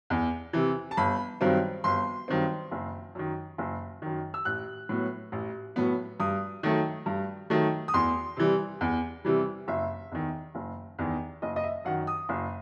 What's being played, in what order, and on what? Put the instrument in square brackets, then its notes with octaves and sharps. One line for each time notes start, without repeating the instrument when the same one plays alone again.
[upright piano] E2
C3 E3
A5
G1 B5
G2 D#3 F#3 C4
G1 C6
G2 D#3 F#3 C4
F#1
F#2 D#3
F#1
F#2 D#3
E6
A1 F#6
A2 F#3 B3
A1
A2 F#3 B3
G2 D#6
D#3 F#3 A3
G2
D#3 F#3 A3
D#6
E2 C6
C3 E3 G3
E2
C3 E3 G3
F#1 E5
E2 D#3
F#1
E2 D#3
F#1 D#5
D#5
E5
F#2 D#3 F#5
D#6
F#1